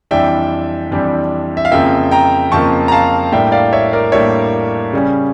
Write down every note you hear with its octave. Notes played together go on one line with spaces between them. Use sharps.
F2 E3 G3 D4 E5 G5
F2 E3 G3 D4
E5
F5
F2 C#3 F3 A#3 E5 G5
G5 A#5
F2 C#3 F3 A#3 A5 C#6
A#5
F5 A5
A2 G3 A#3 D4 E5 G5
D5 F5
C#5 E5
A#4 D5
A2 G3 A#3 D4 C#5 E5
C#3 G3 C#4